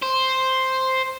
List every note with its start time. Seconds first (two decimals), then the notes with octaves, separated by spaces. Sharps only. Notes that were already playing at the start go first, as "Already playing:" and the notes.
0.03 C5